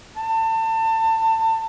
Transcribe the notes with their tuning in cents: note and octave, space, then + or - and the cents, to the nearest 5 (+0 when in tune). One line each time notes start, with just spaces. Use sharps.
A5 +30